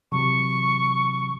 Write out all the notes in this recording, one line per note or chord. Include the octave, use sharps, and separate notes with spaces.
C3 E3 F#3 C#6